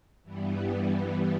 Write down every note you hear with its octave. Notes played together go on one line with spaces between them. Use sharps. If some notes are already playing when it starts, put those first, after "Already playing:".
G2 E3 G3 B3